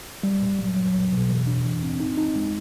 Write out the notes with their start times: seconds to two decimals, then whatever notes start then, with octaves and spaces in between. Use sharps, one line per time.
0.23 G3
0.42 A#2
0.59 F#3
0.77 F#3
0.94 C2
1.12 B2
1.30 E3
1.47 D4
1.65 E3
1.83 C4
2.00 D#4
2.17 D#4
2.36 G#3